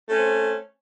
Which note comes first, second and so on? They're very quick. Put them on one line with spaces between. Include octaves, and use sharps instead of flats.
A3 C#4 C4